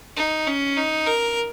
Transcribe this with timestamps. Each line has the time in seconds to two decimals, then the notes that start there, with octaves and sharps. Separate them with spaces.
0.16 D#4
0.47 C#4
0.77 D#4
1.07 A#4